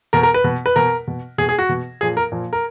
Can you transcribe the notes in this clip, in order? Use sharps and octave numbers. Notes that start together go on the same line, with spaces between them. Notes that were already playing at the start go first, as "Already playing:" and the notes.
B2 A#4
A#4
B4
B2
B4
B2 A#4
B2
B2 G#4
G#4
F#4
B2
A#2 F3 G#4
A#4
A#2 F3
A#4